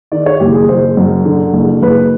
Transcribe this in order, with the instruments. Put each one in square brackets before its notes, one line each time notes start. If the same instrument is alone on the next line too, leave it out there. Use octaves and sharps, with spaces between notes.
[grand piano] D#3 D5
C#5
F#1 G4
G#4
F#1 C5
F#2
D3
F#1
F#1 B4